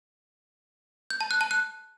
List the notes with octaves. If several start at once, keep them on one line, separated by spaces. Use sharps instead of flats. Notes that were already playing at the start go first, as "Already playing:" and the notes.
G6
A5
F#6
A5
F#6